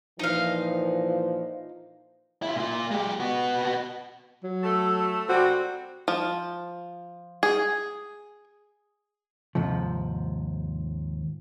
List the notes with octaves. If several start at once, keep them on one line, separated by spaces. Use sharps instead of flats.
A#2 E3 F3 D#4 F5
E4 F4
A#2 F4
G#3 G4
B3 F#4
F#3
A3 A4
C3 G3 C4 F#4
F3
G#4
D#2 G#2 C3 F3